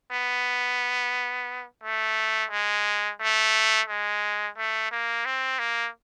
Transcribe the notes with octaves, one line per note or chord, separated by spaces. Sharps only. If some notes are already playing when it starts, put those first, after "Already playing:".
B3
A3
G#3
A3
G#3
A3
A#3
C4
A#3